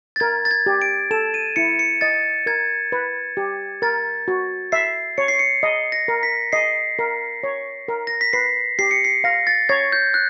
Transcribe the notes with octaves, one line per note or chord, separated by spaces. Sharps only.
A6
A#4 G#6
A6
G#6
G4
D7
A4 E7
D#7
E4 C#7
C#7
D#5 A6
A#4 G#6
B4
G4
A#4 A6
F#4
E5 C7
C#5 C#7
C7
C#7
D#5
A#6
A#4
B6
D#5 C7
A#4
C#5
A#4
A#6
B6
B4 C7
G4 C7
C#7
C7
F5 A#6
A6
C#5 G#6
G6
F#6